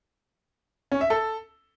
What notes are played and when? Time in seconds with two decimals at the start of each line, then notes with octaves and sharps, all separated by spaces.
0.92 C#4
1.01 E5
1.10 A4